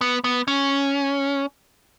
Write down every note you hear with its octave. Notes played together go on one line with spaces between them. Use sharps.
B3
B3
C#4